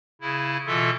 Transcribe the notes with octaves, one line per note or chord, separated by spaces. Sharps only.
C#3 E4
B2 E3 F4 A4 E5